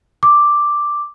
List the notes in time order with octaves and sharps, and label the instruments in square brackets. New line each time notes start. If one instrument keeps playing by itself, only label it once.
[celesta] D6